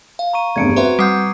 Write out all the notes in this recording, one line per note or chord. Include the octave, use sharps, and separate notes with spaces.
F5
A#5 C#6 D#7
F1 E2 G2 G#6 C#7 D7
C4 F#4 B4 C5 E5 C6
G3 F#5 D6 D#6 G6 C7